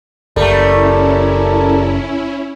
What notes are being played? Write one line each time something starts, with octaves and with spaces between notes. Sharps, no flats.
F#1 G3 A3 C#4 E4 A4 A#4